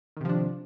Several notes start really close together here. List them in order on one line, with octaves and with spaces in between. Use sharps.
D#3 C3 F3 D4